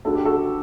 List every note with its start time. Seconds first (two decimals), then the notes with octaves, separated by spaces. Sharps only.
0.05 D2 D3 A4
0.15 G4
0.25 F#4 A4